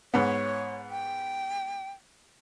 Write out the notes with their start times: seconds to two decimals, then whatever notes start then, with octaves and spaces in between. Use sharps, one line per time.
0.14 G#2 B3 C#5
0.90 G5